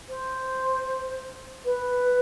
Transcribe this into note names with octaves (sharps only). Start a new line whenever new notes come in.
C5
B4